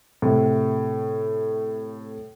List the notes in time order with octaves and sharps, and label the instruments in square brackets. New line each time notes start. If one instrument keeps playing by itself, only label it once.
[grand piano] A2 C3